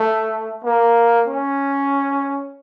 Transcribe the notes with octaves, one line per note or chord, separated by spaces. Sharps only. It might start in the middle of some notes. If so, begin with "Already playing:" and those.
Already playing: A3
A#3
C#4